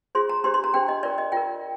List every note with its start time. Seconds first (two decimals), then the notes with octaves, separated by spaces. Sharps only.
0.15 F4 G#4 C5 C6
0.29 A#5
0.44 D4 G4 C5 C6
0.54 C6
0.64 A#5
0.74 D4 G4 C5 G5
0.88 D#5
1.03 F4 A#4 D5
1.18 D#5
1.32 F4 A#4 G5